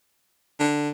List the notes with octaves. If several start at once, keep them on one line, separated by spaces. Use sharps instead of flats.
D3